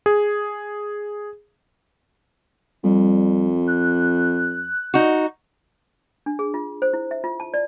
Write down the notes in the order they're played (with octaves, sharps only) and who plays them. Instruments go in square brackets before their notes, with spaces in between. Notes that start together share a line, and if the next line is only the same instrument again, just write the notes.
[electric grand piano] G#4
[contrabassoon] F2 [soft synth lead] G3
[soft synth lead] F#6
[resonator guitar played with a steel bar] D#4 F#4
[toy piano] D4
G#4
F4
C5
E4
E5
F4
A5
D5